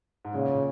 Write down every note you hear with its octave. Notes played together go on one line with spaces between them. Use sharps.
G#2
A#2 C#3
A#2